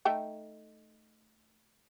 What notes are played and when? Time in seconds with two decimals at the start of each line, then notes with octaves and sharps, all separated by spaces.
0.05 A3 D#4 G5